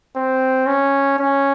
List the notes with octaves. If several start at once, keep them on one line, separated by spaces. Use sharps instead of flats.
C4
C#4
C#4